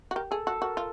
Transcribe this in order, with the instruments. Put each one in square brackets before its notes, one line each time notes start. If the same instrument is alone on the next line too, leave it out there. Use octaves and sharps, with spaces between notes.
[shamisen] F#4
[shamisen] G4 [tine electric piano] A#4
[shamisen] G#4 [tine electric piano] A4
[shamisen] F#4 [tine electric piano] A4
[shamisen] F#4 [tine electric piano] A#4
[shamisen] F4